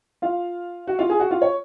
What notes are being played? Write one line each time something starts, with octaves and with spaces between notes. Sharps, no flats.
F4 F5
F#4 F#5
F4 F5
G#4 G#5
F#4 F#5
F4 F5
C#5